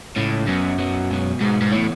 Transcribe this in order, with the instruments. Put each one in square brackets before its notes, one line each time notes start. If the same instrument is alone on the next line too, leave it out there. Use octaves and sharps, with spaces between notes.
[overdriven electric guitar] A2 [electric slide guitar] C#3 G#3 C#4
[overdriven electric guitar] F#2 [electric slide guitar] F#3 B3 F#4
[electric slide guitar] F#3 B3 F#4
B2 G#3 B3 F#4
[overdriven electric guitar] G#2 [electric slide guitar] B2 G#3 B3 F#4
[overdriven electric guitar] G#2
[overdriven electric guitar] A2 [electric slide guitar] E3 B3 E4 A4 C#5